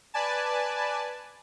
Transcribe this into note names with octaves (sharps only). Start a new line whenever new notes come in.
B4 D5 G#5 A5